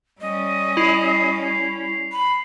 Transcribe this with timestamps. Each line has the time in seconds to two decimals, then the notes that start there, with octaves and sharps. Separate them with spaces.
0.21 G3 C#4 D#5
0.77 E4 C7 C#7 F7
2.12 B5